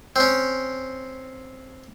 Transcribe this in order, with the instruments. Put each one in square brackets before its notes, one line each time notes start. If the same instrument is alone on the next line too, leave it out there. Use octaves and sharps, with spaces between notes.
[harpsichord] C4 C#4